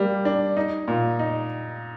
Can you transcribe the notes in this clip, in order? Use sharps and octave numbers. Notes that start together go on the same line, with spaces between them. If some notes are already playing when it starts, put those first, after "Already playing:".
Already playing: G3 A#3
D4
D#4
A#2
D#4